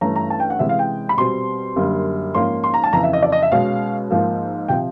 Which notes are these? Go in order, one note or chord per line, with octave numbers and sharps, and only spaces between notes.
G2 E3 A3 C#4 A#5
A#5
A5
G5
F#5
C3 E3 G#3 C#4 E5
F5
G5
B5
B2 G3 C4 C6
F#2 D3 G3 A#3
G#2 F3 A#3 C#4 C6
C6
A#5
A5
F2 C#3 E3 A#5
E5
D#5
D5
D#5
E5
B2 G#3 C#4 F5
G#2 F3 A#3
C3 F3 G5